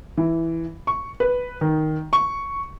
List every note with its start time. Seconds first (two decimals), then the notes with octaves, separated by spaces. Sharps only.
0.17 E3
0.87 C#6
1.20 B4
1.61 D#3
2.13 C#6